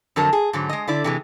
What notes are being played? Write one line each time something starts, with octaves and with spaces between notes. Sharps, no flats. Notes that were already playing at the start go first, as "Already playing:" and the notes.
F2 D3 F#3 D4 A#4 A5
G#4
G#2 D3 F#3
G#3 D#5
D3 E4 D5
C3 E3 G#3